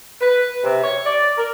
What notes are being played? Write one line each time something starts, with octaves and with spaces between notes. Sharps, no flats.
B4
C3
C#5
D5
A#4